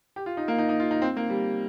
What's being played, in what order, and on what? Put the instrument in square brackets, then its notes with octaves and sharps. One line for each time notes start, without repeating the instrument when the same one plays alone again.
[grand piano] G4
F4
D#4
A#3
D#4
D#4
F4
D#4
C4
A#3
G3